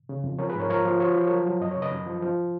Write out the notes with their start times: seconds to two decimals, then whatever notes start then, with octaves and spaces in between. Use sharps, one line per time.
0.09 C#3
0.24 F2
0.39 F3 A#4 C#5
0.49 G#4 B4
0.55 G#2 A#4 C#5
0.70 F3 A#4 C#5
0.85 F3
1.00 F3 C#5
1.14 F3 B4
1.27 F#3 A#4 C#5
1.46 F#3
1.61 F#2 D#5
1.71 C#5
1.76 C#3
1.82 B4 D#5
1.92 F#2
2.06 F3
2.22 F3